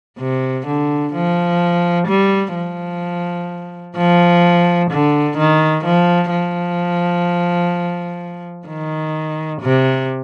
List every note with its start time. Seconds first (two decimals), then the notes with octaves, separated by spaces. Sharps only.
0.19 C3
0.67 D3
1.13 F3
2.08 G3
2.55 F3
3.97 F3
4.91 D3
5.37 D#3
5.85 F3
6.31 F3
8.68 D#3
9.61 C3